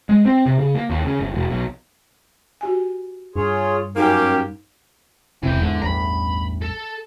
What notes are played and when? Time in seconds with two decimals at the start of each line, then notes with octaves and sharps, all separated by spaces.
0.09 G#3
0.25 C4
0.46 C3
0.59 C#3
0.75 A#3
0.90 D#2
1.05 C#3
1.20 G1
1.34 E1
1.50 B1
2.61 F#4 G4 G#5
3.36 G2 F4 G#4 C#5
3.96 F#2 A#3 C#4 D#4 G4 F#5
5.43 D#1 E2 C3 E3 G5
5.62 E2 G#2 D3 E3
5.82 A1 E2 G2 A#5 B5
6.62 A4